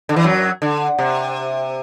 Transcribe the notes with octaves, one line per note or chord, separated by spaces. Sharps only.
D3
E3
F#2 F#3
D3
C3